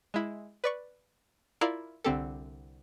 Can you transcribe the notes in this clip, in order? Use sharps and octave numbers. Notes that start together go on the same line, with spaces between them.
G#3 E4
B4 D5 C#6
E4 F4 A#4 D5 F5
C2 D3 C4 G4 A4